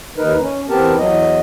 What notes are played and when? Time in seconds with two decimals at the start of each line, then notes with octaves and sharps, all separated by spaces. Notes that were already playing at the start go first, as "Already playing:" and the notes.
0.17 D#2 D#4 A#4 B4
0.41 C#4
0.69 E2 B3 C4 G4 A#4 A5
0.99 E2 F#3 D#5